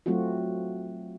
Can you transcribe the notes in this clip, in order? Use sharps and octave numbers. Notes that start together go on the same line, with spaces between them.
F#3 A3 C4 F4 F#4